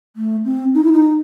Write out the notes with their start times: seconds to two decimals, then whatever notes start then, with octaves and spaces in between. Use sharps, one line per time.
0.16 A3
0.45 C4
0.74 D#4
0.84 E4
0.93 D#4